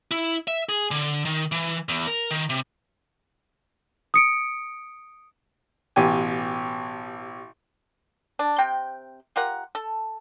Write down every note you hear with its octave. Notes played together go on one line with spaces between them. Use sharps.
E4
E5
G#4
D3
D#3
E3
E2
A#4
D#3
C3
D#6 C#7 D7
A1 B2 G4 G#5
D4
C3 C4 G5
F4 G4 A#4 F#5
A4